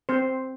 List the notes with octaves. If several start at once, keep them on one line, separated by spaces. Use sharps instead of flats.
C4 C5